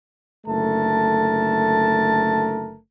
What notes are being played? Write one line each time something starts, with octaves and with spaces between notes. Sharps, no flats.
F#1 D3 A3 A#4 A5